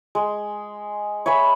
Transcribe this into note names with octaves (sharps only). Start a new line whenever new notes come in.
G#3
C#5 E5 G#5 B5